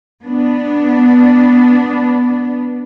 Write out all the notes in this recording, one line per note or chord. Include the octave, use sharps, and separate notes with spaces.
B3 D4